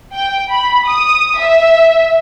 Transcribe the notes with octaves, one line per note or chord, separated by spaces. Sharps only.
G5
B5
D#6
E5